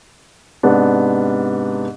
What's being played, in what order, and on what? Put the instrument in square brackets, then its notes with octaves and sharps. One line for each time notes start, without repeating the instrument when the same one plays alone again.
[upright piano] G#2 C3 B3 D4